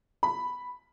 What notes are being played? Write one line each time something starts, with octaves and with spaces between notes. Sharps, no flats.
B5